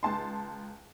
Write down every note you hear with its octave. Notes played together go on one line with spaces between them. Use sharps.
C#2 A5 C6